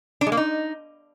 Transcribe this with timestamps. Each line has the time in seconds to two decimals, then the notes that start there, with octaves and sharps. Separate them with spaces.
0.21 D4
0.27 G#3
0.32 A#3
0.37 D#4